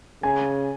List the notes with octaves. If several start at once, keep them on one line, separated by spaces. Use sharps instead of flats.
C#3 G#5